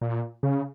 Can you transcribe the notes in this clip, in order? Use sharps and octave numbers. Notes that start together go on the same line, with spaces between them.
A#2
C#3